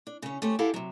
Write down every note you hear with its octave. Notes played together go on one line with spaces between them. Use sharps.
D4
C#3 C#4
A3 C#4 G4 C5
E4 G4 A4 F5 F#5
C3 F#3